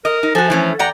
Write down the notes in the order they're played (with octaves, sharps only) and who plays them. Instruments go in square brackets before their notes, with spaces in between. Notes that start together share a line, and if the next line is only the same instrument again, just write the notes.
[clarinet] A#4 [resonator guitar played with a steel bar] D#5
[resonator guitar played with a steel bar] D#4
[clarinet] F3 [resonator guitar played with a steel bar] F#4 A4 [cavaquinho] G#5
[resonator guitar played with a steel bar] E3 A3 C#4
[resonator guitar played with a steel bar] E2 [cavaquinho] D5 G5 A#5 [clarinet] F#5